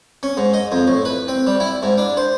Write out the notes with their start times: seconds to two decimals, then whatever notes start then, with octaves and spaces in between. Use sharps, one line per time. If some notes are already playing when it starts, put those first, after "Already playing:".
0.23 C#4
0.37 G#2
0.54 D#5
0.72 F2
0.87 A2
1.05 B4
1.28 C4
1.47 G3
1.60 E4
1.83 G#2
1.98 D4
2.17 C5